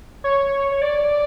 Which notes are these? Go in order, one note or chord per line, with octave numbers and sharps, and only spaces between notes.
C#5
C#5
D5